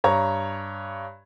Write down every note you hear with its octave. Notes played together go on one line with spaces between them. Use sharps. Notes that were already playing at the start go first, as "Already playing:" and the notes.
G2 C#5 A#5